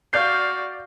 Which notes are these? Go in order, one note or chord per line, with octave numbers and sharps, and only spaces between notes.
F#4 D5 F5 G6 C7